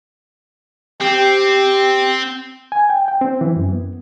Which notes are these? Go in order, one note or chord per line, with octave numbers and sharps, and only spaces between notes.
C4 G4
G#5
G5
G5
C4
E3
F#2
B3